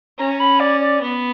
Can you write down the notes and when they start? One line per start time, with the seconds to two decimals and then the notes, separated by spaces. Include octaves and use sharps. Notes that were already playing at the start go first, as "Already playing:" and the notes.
0.18 C#4 A#5
0.39 B5
0.59 D5
0.80 D5
1.01 B3